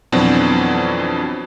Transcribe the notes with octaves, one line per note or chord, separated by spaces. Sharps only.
F2 B2 E3 F#3 C4 D4